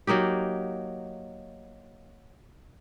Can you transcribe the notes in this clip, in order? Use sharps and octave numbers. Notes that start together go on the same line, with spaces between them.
F#3 A#3 D#4 G4